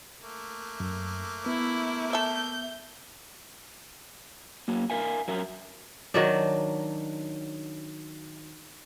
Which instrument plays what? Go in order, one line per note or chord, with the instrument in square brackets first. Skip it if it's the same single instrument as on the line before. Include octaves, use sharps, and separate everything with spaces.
[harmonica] A3 A#3
[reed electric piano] F#2
[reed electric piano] B3 [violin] E4
[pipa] A4 E5 [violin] G6
[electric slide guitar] F#3 A#3
A#4 E5 F5 G#5
F#3 A#4 E5
[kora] D#3 F#3 D4